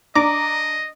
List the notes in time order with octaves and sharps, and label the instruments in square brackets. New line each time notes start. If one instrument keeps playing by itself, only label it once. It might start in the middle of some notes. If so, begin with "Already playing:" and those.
[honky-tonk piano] D4 [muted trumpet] D#5 [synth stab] A#5 D6